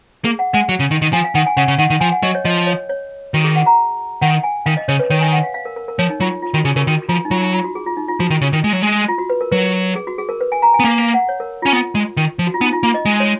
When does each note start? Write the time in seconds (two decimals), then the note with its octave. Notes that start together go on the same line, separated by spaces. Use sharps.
0.24 A#3 G#4
0.39 F#5
0.53 G#3 F#5
0.69 F#3
0.80 C#3
0.91 D#3
1.02 D#3
1.13 F3 G#5
1.24 F5
1.35 D#3 F#5
1.46 G#5
1.57 C#3 F#5
1.68 C#3
1.78 D#3 F#5
1.90 D#3
2.01 F3 G#5
2.12 F#5
2.23 F#3 D#5
2.35 C#5
2.45 F3 D#5
2.67 C#5
2.89 C#5
3.34 D#3 F#4
3.44 G#4
3.56 F#5
3.66 A#5
4.22 D#3 F#5
4.43 G#5
4.66 D#3 F5
4.77 D#5
4.88 C#3 C#5
4.99 B4
5.10 D#3 C#5
5.21 G#5
5.32 F#5
5.43 F5
5.54 F5
5.65 A#4
5.76 A#4
5.88 A#4
5.99 F3 C#5
6.10 D#4
6.20 F#3 F4
6.42 F4
6.54 D#3 F#4
6.64 C#3 G#4
6.76 C#3 A#4
6.87 D#3 F#4
7.09 F3 F4
7.25 D#4
7.31 F#3 F4
7.42 D#4
7.54 F4
7.64 F#4
7.75 G#4
7.86 F4
7.97 D#4
8.08 F4
8.19 F3 F#4
8.30 D#3
8.41 C#3
8.53 D#3
8.64 G#3
8.73 F#3
8.82 G#3
9.08 F4
9.18 F#4
9.30 B4
9.41 A#4
9.51 F#3 B4
9.96 G#4
10.07 F#4
10.18 G#4
10.29 A#4
10.41 B4
10.52 G#5
10.62 A#5
10.74 G#5
10.80 B3
10.85 A#3 F5
10.99 F5
11.14 F#5
11.29 C#5
11.40 A#4
11.62 F4
11.66 C#4
11.73 B3 F4
11.95 G#3
12.17 D#3
12.39 F3
12.47 F#4
12.54 F4
12.61 B3 D#4
12.73 F4
12.83 A#3 F4
12.94 D#5
13.05 G#3 D#5
13.20 C#5